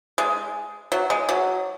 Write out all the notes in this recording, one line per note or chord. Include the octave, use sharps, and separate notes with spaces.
G#3
F#3
G#3
F#3